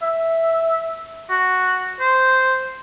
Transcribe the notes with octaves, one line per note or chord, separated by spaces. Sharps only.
E5
F#4
C5